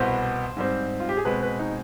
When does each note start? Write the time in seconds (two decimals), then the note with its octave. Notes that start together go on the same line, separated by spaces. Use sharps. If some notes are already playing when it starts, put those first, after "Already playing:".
Already playing: C2 B2 B3 C5
0.57 G#2 G3 C4
1.00 F4
1.09 G4
1.17 G#4
1.25 B2 G#3 C4 B4
1.43 B4
1.59 D#4